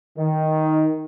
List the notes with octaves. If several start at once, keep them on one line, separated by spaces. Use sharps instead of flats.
D#3